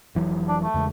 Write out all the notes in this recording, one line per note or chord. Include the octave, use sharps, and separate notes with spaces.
F1 E3 F#3
D4
A3
E2 C#3 G#3